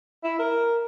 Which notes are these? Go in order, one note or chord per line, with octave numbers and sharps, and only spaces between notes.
E4
A#4